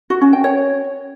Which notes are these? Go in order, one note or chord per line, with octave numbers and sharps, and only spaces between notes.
F#4
C#4
G5
C#5